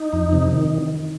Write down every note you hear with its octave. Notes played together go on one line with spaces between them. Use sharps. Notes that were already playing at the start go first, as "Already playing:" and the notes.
Already playing: D#4
F2
C3
D#3